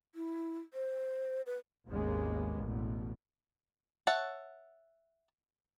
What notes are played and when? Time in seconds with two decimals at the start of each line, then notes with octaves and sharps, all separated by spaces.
0.15 E4
0.74 C5
1.46 B4
1.89 G#1 D#2 C#3 G#3 A#3 B3
2.60 A1 E2 B2
4.07 C#5 E5 F#5 A5